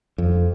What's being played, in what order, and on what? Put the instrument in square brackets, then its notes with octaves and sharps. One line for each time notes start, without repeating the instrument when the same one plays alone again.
[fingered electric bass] F2